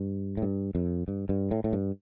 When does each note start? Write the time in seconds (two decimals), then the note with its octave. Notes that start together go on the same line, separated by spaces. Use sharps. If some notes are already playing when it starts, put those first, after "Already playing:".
Already playing: G2
0.37 A2
0.42 G2
0.75 F2
1.08 G2
1.29 G2
1.51 A2
1.64 A2
1.73 G2